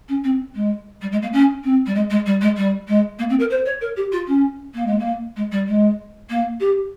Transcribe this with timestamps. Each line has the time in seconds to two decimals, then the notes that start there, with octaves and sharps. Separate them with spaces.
0.08 C#4
0.24 C4
0.55 G#3
1.01 G3
1.11 G#3
1.22 A#3
1.32 C#4
1.63 C4
1.86 G3
1.94 G#3
2.10 G#3
2.26 G3
2.41 G#3
2.56 G3
2.87 G#3
3.18 A#3
3.29 C4
3.39 A#4
3.50 C5
3.65 C#5
3.81 A#4
3.96 G4
4.12 F4
4.27 C#4
4.74 A#3
4.86 G#3
4.99 A#3
5.36 G#3
5.51 G3
5.67 G#3
6.29 A#3
6.60 G4